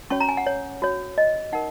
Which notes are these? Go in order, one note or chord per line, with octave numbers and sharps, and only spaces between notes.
C#4 F#4 C#5 C#6
A#5
G#5
F#5
C#5
F#4 C#5
D#5
D#4 A#4 F#5